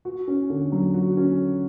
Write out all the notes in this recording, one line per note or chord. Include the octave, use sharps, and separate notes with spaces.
F#4
C#4
D3
F#3
F#4
C#4